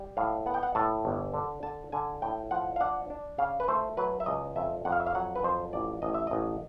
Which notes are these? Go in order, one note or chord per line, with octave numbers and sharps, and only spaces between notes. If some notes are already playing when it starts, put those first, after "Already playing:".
Already playing: G3
A2 F5
B3 F#5
G5
F#5
A2 A5
G1
D3
D3 A5
D3 G#5
A2 G5
F3 F#5
F5
D4 F#5
D4
C#3 F5
B4
A3 C5
F#3 B4
E5
C#2 D#5
F2 E5
F2 F#5
F5
E5
F5
F#3 F#5
B4
F2 C5
A1 D5
A1 D#5
E5
A1 D#5